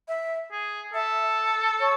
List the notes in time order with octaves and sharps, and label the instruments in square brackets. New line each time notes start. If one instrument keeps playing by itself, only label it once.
[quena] E5
[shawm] G#4
[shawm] A4 [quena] E5
[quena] C#5